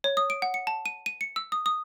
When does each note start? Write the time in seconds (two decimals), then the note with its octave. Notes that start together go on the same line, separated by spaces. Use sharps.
0.04 C#5
0.17 D#6
0.30 D7
0.42 F#5
0.54 C#7
0.67 A5
0.86 D#7
1.06 D#7
1.21 C#7
1.36 E6
1.52 D#6
1.66 D#6